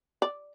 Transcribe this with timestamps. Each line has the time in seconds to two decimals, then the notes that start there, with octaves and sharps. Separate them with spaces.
0.22 D5